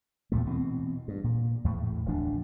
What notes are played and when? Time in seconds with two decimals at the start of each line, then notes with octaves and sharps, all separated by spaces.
0.32 E2 A#2 A3
0.46 B2 E3 F#3 C4
1.08 G2
1.24 A#2
1.64 E2 A2
2.06 D1 A1 F3 D4